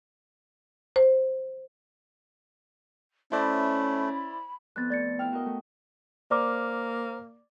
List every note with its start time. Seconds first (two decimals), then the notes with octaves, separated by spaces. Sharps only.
0.96 C5
3.32 A3 C#4 E4 C5 D5 B5
4.76 F2 B3 F#6 A6
4.90 A3 D5 A6 C#7
5.19 E4 F5 G5 F6
5.32 F#4 A#4 D#5
5.46 A3
6.31 A#3 C5 D5 A#5 D6 F6